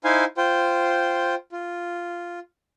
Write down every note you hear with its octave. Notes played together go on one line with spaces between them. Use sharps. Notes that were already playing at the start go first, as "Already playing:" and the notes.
D#4 E4 C5 F5 G#5
F4 C5 G5
F4